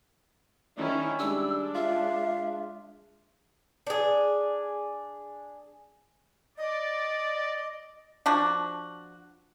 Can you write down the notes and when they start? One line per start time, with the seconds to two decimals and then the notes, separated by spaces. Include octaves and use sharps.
0.77 D#3 C#4 D4 E4
1.19 G3 G#3 D4 E6
1.75 F4 E5
3.87 D4 G#4
6.58 D5 D#5
8.26 F3 D4 F#4